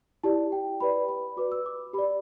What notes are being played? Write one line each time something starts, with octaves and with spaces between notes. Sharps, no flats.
E4 G4 D5 A5
G5
G4 B4 D5 B5
B5
F#4 B4 D5 D6
E6
D6
G4 B5
D5